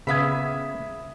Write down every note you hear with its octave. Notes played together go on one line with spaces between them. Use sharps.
C#3 B3 E5 F5 B5 D#6 G#6 B6